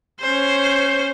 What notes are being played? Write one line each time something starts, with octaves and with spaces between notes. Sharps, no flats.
C#4 C5